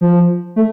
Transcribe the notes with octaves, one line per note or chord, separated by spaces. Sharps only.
F3
A3